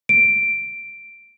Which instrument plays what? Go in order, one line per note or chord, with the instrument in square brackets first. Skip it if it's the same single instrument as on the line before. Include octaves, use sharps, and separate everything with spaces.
[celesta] D7